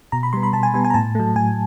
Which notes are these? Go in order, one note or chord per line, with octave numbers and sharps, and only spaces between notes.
B2 A#5
B5
G3 B3 C6
B5
B2 A5
G#5
G3 B3 G#5
G#5
A#5
A2 A5
F#3 A3
A2 G#5